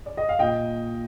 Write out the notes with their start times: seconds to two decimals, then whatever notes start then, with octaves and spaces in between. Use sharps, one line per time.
0.06 D5
0.17 D#5
0.29 F5
0.39 A#2 D#5 G5